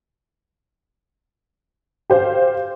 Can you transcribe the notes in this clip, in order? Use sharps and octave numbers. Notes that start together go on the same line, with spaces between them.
G4 C5 F5